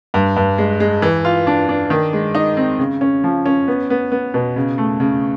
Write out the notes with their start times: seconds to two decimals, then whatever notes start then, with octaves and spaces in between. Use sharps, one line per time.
0.14 G2
0.36 G2
0.58 G#3
0.80 G#3
1.02 E3
1.25 F4
1.47 D4
1.69 D4
1.90 D#3
2.13 G#3
2.35 D#4
2.57 C4
2.79 C#3
3.01 C#4
3.24 F3
3.46 C#4
3.68 B3
3.90 B3
4.12 B3
4.34 B2
4.56 C#3
4.78 A3
5.00 C#3